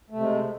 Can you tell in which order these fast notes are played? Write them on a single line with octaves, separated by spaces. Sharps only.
A3 C3 G#3